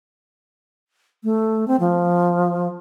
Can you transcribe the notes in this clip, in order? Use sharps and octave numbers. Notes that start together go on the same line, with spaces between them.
A3
C4
F3